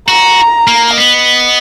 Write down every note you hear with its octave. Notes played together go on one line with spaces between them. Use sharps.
F#4 A#5
A#3
B3 D#5